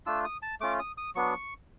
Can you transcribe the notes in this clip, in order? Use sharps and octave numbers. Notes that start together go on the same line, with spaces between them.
A3 D4 F4 E6
D#6
A5
A3 C#4 F4 D6
D#6
D#6
F#3 B3 D4 C#6